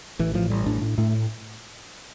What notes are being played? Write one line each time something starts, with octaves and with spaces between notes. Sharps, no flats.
A1 E3
A2 F3
A1 G3
A2 D4
A2
A2 A3